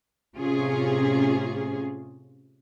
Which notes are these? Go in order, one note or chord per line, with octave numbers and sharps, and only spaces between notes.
A2 C3 C#4 F4 G#4